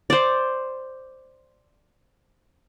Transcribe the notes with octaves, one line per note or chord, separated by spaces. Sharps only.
C5 D5